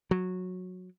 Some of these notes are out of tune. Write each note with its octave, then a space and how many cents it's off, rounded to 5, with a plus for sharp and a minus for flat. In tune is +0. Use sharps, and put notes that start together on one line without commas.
F#3 -15